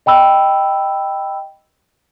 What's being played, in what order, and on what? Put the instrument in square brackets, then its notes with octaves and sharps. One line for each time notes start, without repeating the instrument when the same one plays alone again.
[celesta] D#5 G5 B5 E6